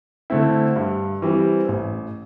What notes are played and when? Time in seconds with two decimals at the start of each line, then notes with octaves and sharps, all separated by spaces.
0.30 D3 A3 C4 E4
0.76 G2
1.22 E3 G3 C4
1.69 A1